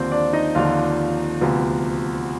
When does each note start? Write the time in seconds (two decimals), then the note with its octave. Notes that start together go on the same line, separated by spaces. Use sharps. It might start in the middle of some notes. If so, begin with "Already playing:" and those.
Already playing: D#2 D3 F3 C4 C5
0.12 D4 D5
0.33 D#4 D#5
0.55 D#2 D3 F3 F4 F5
1.41 D2 C3 F3 B3